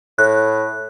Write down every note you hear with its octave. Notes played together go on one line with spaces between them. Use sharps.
A2 F#6